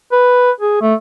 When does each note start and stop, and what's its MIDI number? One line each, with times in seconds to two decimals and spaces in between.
0.12 0.51 71
0.60 0.78 68
0.81 0.94 57